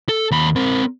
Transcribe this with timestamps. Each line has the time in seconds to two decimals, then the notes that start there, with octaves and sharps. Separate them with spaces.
0.09 A4
0.31 D#2 B5
0.56 C4 A#4